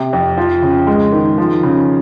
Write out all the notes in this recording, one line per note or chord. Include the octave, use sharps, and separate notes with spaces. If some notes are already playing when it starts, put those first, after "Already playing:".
Already playing: C3
F2
F3
C#3
G#3
D#3
F3
C#3